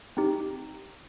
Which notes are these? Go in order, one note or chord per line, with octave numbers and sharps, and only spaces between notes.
C4 D#4 G4